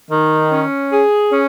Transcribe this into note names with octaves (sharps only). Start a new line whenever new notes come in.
D#3
C#4
G#4
C#4